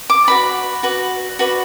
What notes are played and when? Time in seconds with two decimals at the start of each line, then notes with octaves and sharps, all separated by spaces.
0.10 D6
0.28 F#4 B4 D5 B5
0.83 F#4 B4 D5
1.39 F#4 B4 D5